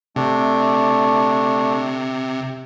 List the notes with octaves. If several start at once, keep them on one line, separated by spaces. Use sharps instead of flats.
C3 A3 D4